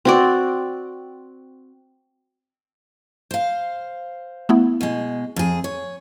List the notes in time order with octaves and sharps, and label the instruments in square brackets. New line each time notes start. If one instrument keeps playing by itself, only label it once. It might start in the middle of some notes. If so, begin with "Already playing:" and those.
[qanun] C4 F#4 D5
[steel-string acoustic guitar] C5 F5
[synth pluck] A3 B3 E4
[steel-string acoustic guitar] B2 G#3
F2 G#4
C#5